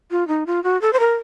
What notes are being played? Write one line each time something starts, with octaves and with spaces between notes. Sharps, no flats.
F4
D#4
F4
F#4
A4
C5
A#4